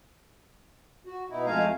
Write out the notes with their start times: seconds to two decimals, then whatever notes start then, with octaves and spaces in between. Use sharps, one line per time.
1.06 F#4
1.30 B2 D#4 E4
1.46 F2 G#3 A3 F5 G#5 A#5